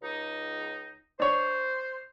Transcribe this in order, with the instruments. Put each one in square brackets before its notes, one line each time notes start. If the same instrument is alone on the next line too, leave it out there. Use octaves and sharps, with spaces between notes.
[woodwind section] C#2 D#4
[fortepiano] D4 C#5 [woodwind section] C5